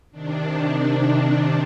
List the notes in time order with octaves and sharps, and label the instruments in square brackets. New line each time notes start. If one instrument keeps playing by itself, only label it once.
[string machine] C3 D#3 D4